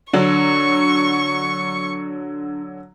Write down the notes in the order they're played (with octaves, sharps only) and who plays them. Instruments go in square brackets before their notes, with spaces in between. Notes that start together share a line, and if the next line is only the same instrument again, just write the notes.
[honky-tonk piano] D3 F#3 [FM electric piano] D4 [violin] C#6